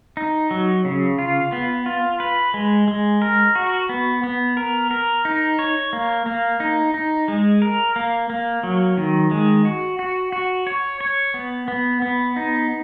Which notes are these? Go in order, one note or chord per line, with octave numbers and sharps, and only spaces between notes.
D#4
F#3
C#3
F4
B3
F4
B4
G#3
G#3
A#4
F#4
B3
B3
A#4
A#4
D#4
C#5
A#3
A#3
D#4
D#4
G#3
A#4
A#3
A#3
F#3
D#3
G#3
F#4
F#4
F#4
C#5
C#5
B3
B3
B3
D#4